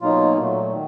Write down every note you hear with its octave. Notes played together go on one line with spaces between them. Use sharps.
B2 F#3 A#3 D#4 F4
A#2 F#3 A3
D#3